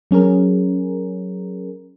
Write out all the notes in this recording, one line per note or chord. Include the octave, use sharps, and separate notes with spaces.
F#3 C#4 G#4 A#4